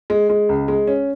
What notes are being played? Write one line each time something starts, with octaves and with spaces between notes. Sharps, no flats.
G#3
G#3
C#2
G#3
C#4